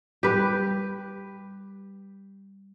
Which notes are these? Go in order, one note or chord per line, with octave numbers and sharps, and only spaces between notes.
G3 G4 B4